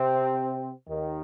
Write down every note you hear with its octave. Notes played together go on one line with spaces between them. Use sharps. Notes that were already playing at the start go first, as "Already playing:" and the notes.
Already playing: C3 C4
D#2 D#3